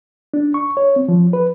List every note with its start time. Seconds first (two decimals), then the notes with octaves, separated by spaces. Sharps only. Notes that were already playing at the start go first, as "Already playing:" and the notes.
0.34 D4
0.54 C#6
0.77 C#5
0.96 C4
1.08 F3
1.33 B4